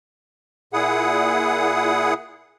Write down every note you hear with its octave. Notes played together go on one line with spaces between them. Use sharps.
A#2 E4 G#4 F#5 D#6